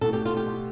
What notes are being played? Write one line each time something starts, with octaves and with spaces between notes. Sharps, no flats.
B2 A3 E4 A4
G4
F4
G4